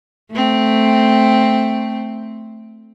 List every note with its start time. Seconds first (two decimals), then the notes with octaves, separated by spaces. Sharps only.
0.31 A3 C4